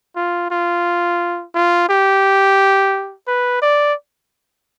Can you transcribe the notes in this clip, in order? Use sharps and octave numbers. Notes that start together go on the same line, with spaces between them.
F4
F4
F4
G4
B4
D5